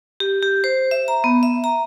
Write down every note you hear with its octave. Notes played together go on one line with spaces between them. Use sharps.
G4
G4
C5
E5
A#5
B3
E5
A#5